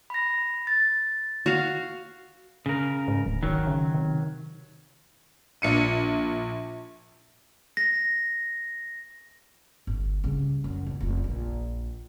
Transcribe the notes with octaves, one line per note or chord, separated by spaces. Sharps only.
B5 A#6
A6
F#4 F5
C#3 A#4
G#2
D1
G#1 D#3 F#3
C#3
C3
A#1 C#7 D#7
A#6
G1
C#3 G3
F#2
D#2
F1 F4
A#1